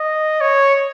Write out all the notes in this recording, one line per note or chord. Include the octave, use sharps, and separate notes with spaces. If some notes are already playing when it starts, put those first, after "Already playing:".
Already playing: D#5
C#5